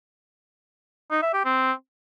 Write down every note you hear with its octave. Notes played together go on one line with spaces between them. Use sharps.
D#4
E5
G4
C4